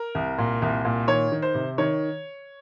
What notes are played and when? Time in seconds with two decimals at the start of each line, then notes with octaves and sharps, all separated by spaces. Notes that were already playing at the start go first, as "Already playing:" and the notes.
Already playing: A#4
0.15 C2
0.38 A#2
0.62 C2
0.85 A#2
1.07 D#3 C#5
1.32 D#3
1.42 C5
1.55 C3
1.78 D#3 C#5